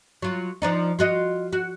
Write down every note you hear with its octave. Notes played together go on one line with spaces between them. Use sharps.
F#3 F4
F3 D4 D#4
F4 F#4 D#5
F#4